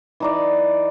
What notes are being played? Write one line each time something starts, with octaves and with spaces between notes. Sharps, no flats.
E3 D#4 D5